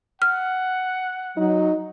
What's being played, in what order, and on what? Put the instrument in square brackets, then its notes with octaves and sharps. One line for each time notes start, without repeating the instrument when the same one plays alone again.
[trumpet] F#5 [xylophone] F6
[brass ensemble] F#3 [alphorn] D#4